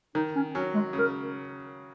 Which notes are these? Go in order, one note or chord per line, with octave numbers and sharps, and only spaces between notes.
D#3 D#4
C#4
F#3 C#4
G#3
C#3 A#4